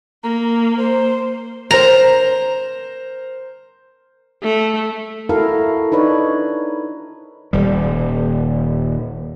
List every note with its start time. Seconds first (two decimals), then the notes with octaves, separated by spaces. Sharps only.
0.24 A#3 A#5
0.77 C5
1.71 A#4 C5 A#5
4.43 A3
5.29 E4 F#4 A4 A#4 F5
5.92 D4 D#4 B4 C#5
7.53 D#1 G3